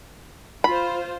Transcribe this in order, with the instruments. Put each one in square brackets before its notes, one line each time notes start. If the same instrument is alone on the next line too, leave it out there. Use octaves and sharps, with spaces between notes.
[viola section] F4 C5 [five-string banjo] B5